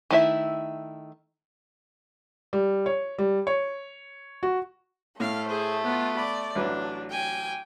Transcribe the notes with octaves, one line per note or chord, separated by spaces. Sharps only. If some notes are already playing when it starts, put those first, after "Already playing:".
D#3 A3 D#4 E4 E5
G3
C#5
G3
C#5
F#4
A2 A3 F5 F6
G#4 C5
B3 F4
D5 B5
A1 F#3 D4 B4
G5 G#5